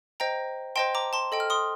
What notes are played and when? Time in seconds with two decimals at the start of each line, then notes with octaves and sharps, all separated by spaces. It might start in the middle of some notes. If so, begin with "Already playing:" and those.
0.20 C5 D#5 G5 A#5
0.76 C5 D#5 G5 A5 C6
0.95 A#5 D6
1.13 A5 C6
1.32 A4 D#5 G5
1.40 F6
1.50 C6 D#6